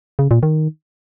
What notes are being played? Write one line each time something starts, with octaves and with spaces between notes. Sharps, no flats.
C#3
A#2
D#3